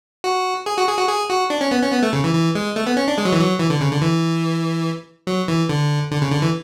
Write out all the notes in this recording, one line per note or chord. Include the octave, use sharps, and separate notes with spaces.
F#4
G#4
F#4
G#4
F#4
G#4
F#4
D4
C#4
B3
C#4
B3
A3
C#3
E3
E3
G#3
A3
B3
C#4
D4
G#3
F#3
E3
F#3
E3
D3
C#3
D3
E3
F#3
E3
D3
D3
C#3
D3
E3